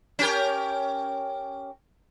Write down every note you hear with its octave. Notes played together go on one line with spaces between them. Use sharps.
C#4 G4 A#4